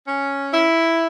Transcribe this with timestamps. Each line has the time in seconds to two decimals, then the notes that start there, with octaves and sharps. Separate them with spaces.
0.06 C#4
0.53 E4